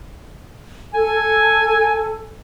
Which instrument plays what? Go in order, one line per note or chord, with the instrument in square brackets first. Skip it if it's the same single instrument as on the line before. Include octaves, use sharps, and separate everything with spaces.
[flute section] A4 [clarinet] G#5